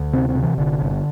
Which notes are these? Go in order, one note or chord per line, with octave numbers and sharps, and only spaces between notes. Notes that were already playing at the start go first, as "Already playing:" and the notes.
Already playing: D2
C3 C4
C4
C3
E3
G1 D3
G1